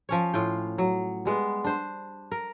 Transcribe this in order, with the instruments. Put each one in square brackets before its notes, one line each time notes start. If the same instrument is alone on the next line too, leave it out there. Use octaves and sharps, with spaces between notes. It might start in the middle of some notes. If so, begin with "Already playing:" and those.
[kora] F3 C#4 C#5
A2 F4 G5
F#3
G3 G#3 B3
D4 C5
A#4